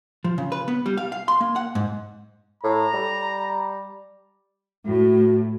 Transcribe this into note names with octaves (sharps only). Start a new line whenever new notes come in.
F3
C#3
B4
B3
G3
F5
F5
C6
A#3
F#5
G#2
A2 A#5
G3
A2 F#4